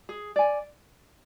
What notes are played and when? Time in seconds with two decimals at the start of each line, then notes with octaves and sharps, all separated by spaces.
0.09 G#4
0.36 D5 G#5